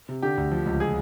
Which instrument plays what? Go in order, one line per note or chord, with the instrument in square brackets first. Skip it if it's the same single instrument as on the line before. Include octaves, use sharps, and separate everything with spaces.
[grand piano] C3
[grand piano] D3 [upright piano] G4
[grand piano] D2
F3
C#2
[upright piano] G#4